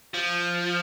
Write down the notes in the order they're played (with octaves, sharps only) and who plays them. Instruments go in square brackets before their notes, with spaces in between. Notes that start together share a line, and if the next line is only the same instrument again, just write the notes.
[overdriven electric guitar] F3